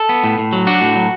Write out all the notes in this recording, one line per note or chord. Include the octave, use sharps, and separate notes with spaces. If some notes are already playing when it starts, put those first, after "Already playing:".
Already playing: A4
B3
A2
A2
F#3
D4 F#4
A2
F#3